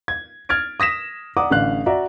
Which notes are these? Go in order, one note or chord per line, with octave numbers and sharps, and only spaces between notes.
G#6
F6 G#6 A6 D7
D#6 A#6 B6 E7
D5 F#5 A#5 D6 D#6
A1 D3 F5 F#6
F#4 D5 E5 A#5